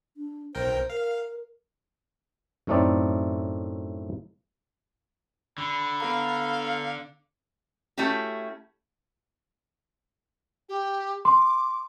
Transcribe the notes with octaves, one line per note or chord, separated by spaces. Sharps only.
D4
B1 A#4 C5 G5
A#4 F5
F#2 A2 A3 C4 D#4 D5
D3 B5
B3 A4 F5 A#5
A3 C#4 E4 F#4 G4
G4
C6 D6